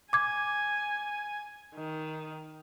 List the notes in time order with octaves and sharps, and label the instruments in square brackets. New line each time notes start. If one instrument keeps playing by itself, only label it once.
[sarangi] G#5 [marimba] D6 G#6
[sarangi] D#3